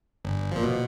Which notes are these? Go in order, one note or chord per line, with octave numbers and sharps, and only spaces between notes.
G1
A#2 F3
B2